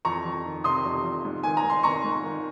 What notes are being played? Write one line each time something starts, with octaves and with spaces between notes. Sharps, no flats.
F2 A#5 C#6
F2
D#3
C3 C6 D#6
F2
F2
G#2
D#3 G#5
A#5
G#2
C6
D#3 A#5 C#6
G#2
D#3